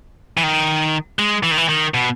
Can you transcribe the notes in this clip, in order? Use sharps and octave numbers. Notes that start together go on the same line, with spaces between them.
E3
D#3
G#3
E3
D#3
E3
D#3
B2